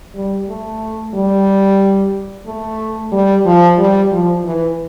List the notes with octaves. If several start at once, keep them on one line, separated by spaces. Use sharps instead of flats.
G3
A3
G3
A3
G3
F3
G3
F3
E3